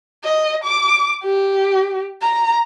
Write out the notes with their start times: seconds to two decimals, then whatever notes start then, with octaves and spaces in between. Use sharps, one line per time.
0.24 D#5
0.64 D6
1.24 G4
2.22 A#5